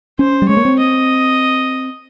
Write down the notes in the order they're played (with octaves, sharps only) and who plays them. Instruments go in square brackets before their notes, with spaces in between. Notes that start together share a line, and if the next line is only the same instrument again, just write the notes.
[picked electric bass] C#4 [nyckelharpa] C5
[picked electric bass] G3
[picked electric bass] G#3 [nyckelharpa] C#5
[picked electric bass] A#3
C4
[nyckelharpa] D#5